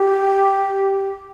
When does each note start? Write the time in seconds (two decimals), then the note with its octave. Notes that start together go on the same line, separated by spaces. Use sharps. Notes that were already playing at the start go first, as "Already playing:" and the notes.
Already playing: G4